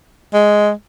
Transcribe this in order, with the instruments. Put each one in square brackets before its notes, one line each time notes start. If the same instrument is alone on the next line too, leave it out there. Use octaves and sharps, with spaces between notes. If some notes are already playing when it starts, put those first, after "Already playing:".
[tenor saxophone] G#3